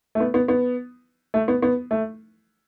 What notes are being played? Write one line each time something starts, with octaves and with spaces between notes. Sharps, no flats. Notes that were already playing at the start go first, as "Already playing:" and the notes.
A3
B3
B3
B3
A3
B3
B3
A3